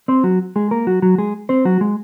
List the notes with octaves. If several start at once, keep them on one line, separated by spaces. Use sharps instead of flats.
C4 C5
F#3 F#4
G#3 G#4
A#3 A#4
F#3 F#4
F#3 F#4
G#3 G#4
C4 C5
F#3 F#4
G#3